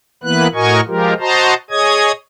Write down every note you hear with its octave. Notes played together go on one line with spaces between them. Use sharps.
E3 A#3 B3 E4 B4 F#6
A2 F#4 A#4 D#5 G#5 C#6
F3 G#3 F4 G4 A#4
F#4 C5 D#5 A5 A#5 C6
G#4 C#5 D#5 D#6 G#6